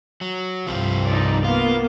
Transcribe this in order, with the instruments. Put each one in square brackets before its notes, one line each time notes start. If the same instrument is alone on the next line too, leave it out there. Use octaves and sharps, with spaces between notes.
[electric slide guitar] F#3
[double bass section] C2 G2 [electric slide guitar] F3 G3 C4
[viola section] D#4 D5
[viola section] A#3 B3 [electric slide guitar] F4